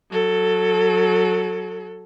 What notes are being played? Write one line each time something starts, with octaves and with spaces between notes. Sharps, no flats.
F#3 A4